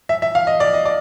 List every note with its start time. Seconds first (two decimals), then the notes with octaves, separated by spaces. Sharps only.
0.09 E5
0.22 E5
0.35 F5
0.47 D#5
0.60 D5
0.73 D#5
0.85 D5